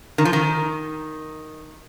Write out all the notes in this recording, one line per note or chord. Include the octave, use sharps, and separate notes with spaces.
D#3
F3
D#3